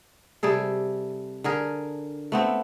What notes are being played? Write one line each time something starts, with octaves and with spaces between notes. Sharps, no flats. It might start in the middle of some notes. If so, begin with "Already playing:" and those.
C3 G3 G#4 A4
D3 G#4 A#4
A3 B3 C4